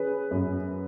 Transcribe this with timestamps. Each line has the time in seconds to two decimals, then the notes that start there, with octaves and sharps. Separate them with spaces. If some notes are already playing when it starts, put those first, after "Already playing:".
Already playing: C#4 G#4 B4
0.31 F#2